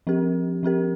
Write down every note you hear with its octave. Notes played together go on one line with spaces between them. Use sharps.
F3 C4 G4 A#4
F3 C4 G4 A#4